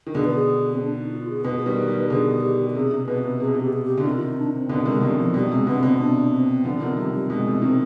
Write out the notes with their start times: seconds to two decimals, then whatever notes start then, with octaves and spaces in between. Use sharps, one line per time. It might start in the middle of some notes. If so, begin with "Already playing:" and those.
0.07 D#3
0.15 B2 D3 G#4
0.24 B4
0.35 G#4
0.73 C4
0.80 D4
0.96 D#4
1.12 F4
1.29 G#4
1.44 B2 B4
1.54 G#4
1.64 D#3 G3 B4
1.88 D#3 G3
2.10 B2 D3 G#4
2.42 G4
2.70 G4
2.75 C3 G#4
2.91 C3
3.07 B2 B4
3.23 C3
3.40 C3 G#4
3.48 B2
3.55 C3
3.61 G4
3.73 G#4
3.83 G4
3.98 D3
4.04 C3 D#3 F4
4.21 D#4
4.38 D4
4.53 C4
4.69 B2 D3 B3
4.80 D3
4.85 C3 D#3 G#3
5.02 B2 D3 G3
5.18 C3 F3
5.34 B2 G3
5.51 C3 G#3
5.67 B2 D3 B3
5.83 B2 C4
5.99 C3 D4
6.32 C4
6.65 D3 F3 B3
6.80 C3 D#3 B3
6.97 C3 G3
7.13 G3
7.30 B2 G#3
7.46 C3
7.62 C3 D#3 C4